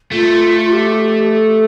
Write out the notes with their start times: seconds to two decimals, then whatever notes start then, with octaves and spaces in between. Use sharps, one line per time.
0.12 A3 F4
0.61 F4
0.72 G4
1.31 A4